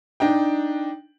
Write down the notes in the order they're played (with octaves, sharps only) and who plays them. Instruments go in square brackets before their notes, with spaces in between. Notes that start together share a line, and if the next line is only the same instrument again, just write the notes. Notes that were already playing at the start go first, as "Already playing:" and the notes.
[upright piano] D4 D#4 G5